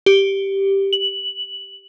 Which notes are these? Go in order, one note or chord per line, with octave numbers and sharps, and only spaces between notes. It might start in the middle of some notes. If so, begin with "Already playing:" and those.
G4
F#7